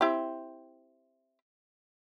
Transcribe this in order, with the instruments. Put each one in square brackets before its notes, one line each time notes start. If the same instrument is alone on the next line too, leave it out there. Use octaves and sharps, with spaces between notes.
[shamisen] C4 E4 G4